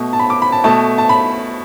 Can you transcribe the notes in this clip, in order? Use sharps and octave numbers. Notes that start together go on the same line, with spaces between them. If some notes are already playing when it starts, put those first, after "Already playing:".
Already playing: B2 A3
A5
B5
D6
B5
A5
B2 A3 A5
A5
B5